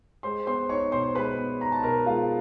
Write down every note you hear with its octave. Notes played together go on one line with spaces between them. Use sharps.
G#3 C5 C6
B3 C5 C6
D#4 C#5 C#6
B2 C5 C6
G#3 B4 B5
B3
D#4 A#5
A5
B2 A#4 A#5
G#3 F4 F5